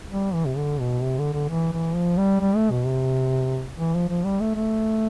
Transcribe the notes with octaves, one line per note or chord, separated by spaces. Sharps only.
G3
E3
C3
D3
B2
C3
D3
D3
E3
E3
F3
G3
G3
A3
B2
C3
E3
F3
F3
G3
A3
A3